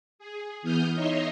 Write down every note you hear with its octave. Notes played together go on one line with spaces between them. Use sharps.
G#4
E3 B3 D#6 F6 G6
D#4 C#5 D#5 E5 A#5 C6